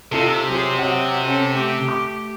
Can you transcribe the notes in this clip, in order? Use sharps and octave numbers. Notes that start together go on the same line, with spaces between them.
C3 D#4 F4 A4
F#3 G#4 C5
F#3 C4 D#5 F#5
C#4 A4
A3 G4
D6